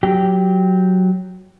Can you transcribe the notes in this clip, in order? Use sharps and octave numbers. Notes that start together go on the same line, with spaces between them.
F#3 G4 G5